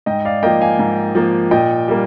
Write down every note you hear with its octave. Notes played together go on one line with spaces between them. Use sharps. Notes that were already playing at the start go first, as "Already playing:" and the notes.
G#2 D#5 G5
D5 F5
F3 A#3 D#5 G5
F5 G#5
G#2
F3 A#3
A#2 D#5 G5
G3 A#3